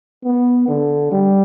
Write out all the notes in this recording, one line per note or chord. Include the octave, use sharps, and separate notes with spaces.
B3
D3
G3